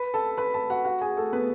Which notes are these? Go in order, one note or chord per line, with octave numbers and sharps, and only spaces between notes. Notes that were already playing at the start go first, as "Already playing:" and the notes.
Already playing: B4 B5
A4 A5
B4 B5
A4 A5
F#4 F#5
F#4 F#5
G#4 G#5
A3 A4
B3 B4